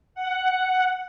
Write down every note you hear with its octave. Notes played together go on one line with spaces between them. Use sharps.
F#5